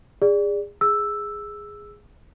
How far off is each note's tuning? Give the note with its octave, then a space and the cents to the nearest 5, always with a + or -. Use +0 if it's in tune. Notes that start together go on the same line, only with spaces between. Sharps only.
G#4 -30 D5 +0
G#4 -5 E6 +0